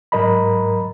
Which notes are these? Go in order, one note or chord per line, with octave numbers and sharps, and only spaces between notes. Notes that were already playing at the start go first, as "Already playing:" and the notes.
G#2 F#3 A#4 D#5 A#5 B5